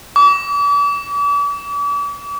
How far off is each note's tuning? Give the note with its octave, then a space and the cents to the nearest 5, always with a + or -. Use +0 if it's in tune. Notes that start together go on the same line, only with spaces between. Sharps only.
D6 -40